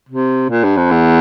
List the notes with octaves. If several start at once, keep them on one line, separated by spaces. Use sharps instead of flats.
C3
A#2
G2
F2
E2